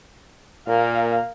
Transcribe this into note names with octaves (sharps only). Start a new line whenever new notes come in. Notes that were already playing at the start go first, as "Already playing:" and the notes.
A#2 A#3 F5